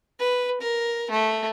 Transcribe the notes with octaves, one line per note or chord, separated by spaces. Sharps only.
B4
A#4
A3